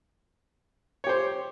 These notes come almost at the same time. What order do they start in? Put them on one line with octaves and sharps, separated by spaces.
C#5 G4 C5